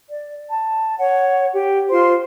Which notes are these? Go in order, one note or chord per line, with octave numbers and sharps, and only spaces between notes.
D5
A5
C#5 F#5
G4
F4 C5 C6